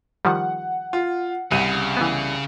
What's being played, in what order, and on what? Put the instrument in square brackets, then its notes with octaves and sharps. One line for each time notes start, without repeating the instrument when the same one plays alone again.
[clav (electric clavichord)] D#3 F3 G3 [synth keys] F#5
[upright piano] F4
[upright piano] C2 D#7 [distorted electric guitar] C#3
[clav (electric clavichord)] E3 B3